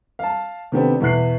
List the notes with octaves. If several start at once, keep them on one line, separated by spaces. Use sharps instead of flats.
F5 A5
C3 D#3 A3 B3 C4 D4
E2 B2 E5 F#6 C7